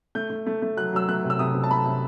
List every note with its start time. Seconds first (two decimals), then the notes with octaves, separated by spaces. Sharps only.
0.15 A3 G6
0.30 A3
0.47 A3
0.62 A3
0.77 F#3 F#6
0.93 F#3 E6
1.08 A3 F#6
1.24 C3
1.30 E6
1.39 C3 D#6
1.54 C3
1.64 A5
1.70 A3 B5
1.86 C3